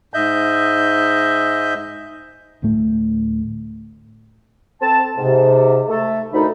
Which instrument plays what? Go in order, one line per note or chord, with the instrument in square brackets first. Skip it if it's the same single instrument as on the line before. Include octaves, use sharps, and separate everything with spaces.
[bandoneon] G#2 D#5 E5 G6
[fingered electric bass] D1 D2 A2 A3
[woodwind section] C4 A4 A5
G#2 C3
A3 A4
D2 D#3 D#4 B5